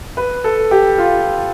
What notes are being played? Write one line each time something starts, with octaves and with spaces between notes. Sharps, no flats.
B4
A4
G4
F4